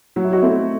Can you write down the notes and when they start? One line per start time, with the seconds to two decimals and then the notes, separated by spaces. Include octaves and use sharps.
0.16 F#3 F#4
0.24 E4
0.33 D#4 F#4
0.42 A3 C4 E4